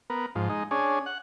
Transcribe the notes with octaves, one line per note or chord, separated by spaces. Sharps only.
B3 A#4
G#2 F3
G#3 D#4
C#4 D4 G#4
F#5